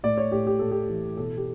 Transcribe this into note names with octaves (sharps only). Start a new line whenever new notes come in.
A2 D5
C#5
A2 G4
G4
A2 A4
G4
E3
B2 A4
G4